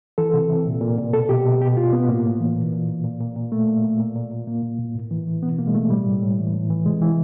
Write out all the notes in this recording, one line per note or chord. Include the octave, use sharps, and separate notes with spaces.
E3 A4
C3
C3
A#2
A#2
A#2
B2 A4
B2 G4
B2
B2 G4
B2 F4
B2 B3
A2 A#3
A2
E3
A#2
A#2
A#2
A#2
A#2
A#2
A#2 A3
A#2
A#2
A#2
A#2
A#2
A#2 A#3
A#2
A#2
A2
E3
E3
B2 B3
B2 A#3
G#3
B2 A3
A2 G3
A2
A2
E3
A2
E3
C3 G#3
E3